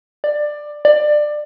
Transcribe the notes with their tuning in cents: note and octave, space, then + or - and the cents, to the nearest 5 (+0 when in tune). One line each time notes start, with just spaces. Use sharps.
D5 +15
D5 +20